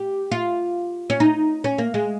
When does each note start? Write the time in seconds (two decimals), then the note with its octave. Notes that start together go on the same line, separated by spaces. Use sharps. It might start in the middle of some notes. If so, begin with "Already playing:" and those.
Already playing: G4
0.32 F4
1.10 C#4
1.20 D#4
1.64 C#4
1.78 A#3
1.94 G#3